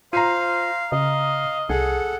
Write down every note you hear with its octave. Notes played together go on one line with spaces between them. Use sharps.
F4 C5 F5 A#5 C7 D#7
C#3 D#5 F5
C2 G#4 A4 F#5